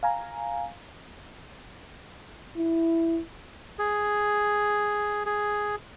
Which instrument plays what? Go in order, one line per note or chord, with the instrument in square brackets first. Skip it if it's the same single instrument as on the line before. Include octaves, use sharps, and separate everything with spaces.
[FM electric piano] F5 G#5 A#5
[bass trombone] E4
[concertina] G#4
G#4